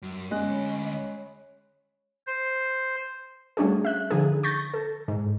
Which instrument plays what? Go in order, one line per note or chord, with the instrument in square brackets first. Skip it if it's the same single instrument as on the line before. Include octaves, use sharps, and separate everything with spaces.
[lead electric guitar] F#2
[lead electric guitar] D2 D#5 [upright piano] G#3 C#4 F#6
[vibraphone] C#5 B5
[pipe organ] C5
[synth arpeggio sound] G3 A3 C#4 D4 F#4 G#4
E5 F#6
D3 F3 D#4 G#4
C#6 G6 A6 A#6
A4
G#2